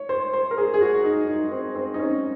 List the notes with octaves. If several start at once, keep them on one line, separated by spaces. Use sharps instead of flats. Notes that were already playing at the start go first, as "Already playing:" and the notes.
Already playing: C#5
C5
C5
A#4
G#4
G#4
F#4
D#4
D#4
C4
C4
D#4
C#4